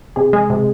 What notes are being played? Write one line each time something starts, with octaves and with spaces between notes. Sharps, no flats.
C3 G#4
G#3
C3